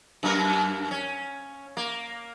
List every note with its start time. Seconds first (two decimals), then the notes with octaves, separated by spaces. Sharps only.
0.23 F#2 A#3 A#4
0.91 C#4
1.77 A#3